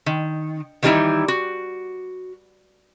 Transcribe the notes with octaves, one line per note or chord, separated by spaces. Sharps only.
D#3
D#3 E3 G3 A#3 D#4 E4
F#4